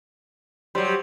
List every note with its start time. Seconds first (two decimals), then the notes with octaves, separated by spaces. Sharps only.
0.75 F#3 G3 C5